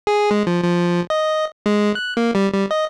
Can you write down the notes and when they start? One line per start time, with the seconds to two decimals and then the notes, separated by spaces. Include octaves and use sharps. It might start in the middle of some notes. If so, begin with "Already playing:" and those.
0.07 G#4
0.31 G#3
0.47 F3
0.64 F3
1.10 D#5
1.66 G#3
1.95 F#6
2.17 A#3
2.35 G3
2.53 G3
2.71 D#5